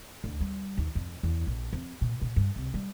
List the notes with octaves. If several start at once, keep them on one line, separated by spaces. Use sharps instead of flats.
D2
G3
D#2
F2
E2
A#1
F2
A#2
A#2
G2
C2
G3